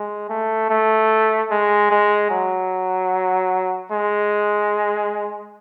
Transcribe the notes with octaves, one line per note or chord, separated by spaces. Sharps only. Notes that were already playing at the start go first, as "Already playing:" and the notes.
Already playing: G#3
A3
A3
G#3
G#3
F#3
G#3